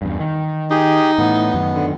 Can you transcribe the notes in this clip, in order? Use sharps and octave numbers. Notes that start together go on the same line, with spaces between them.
E2 G2
D#3
D#4 G4 G#4
A2 E3 B3
F#2 D#3
D3